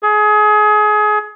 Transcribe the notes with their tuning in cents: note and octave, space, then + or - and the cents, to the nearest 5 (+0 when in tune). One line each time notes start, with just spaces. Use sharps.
G#4 +25